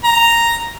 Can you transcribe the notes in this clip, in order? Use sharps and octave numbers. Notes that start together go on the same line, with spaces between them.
A#5